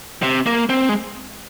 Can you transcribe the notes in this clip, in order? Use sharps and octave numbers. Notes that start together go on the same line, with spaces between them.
C3
A#3
C4
G#3